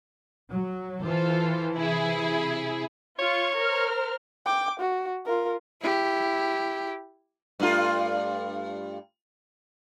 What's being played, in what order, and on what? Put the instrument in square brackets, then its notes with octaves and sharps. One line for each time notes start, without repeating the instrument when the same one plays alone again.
[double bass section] F#3
[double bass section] E3 [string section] F4 A4 C5
[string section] C3 E4 G#4
[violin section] F4 C#6 [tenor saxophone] C#5
[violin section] A#4 C5 F6
[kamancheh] G5 D6
F#4
F4 A#4
[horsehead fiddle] E4 G4
[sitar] G2 A3 F4